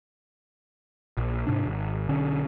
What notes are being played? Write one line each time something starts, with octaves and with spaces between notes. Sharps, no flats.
A#1
G#2 C3 D4
G#1
B1 D3 C#4